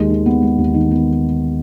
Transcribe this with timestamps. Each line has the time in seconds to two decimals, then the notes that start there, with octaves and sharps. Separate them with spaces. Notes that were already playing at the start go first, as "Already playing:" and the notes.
Already playing: D#2 G#3
0.10 D#3
0.26 B3
0.42 G#3
0.58 D#2
0.74 D#3
0.91 B3